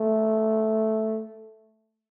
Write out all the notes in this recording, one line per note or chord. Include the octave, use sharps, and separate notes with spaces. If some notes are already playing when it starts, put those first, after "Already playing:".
Already playing: A3